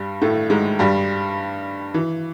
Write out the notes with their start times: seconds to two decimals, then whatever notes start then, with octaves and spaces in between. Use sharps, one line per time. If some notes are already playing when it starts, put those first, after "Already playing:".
Already playing: G2 G3
0.22 A2 A3
0.50 G#2 G#3
0.79 G2 G3
1.94 E3